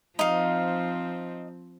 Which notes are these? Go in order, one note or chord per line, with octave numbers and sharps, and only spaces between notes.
F3 C4 D#4 F5